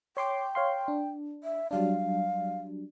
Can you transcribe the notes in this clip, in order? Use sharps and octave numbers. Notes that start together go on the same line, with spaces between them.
C#5 G5 C6 D6
C#5 F5 C6
D4
E5
F#3 G3 D4 F5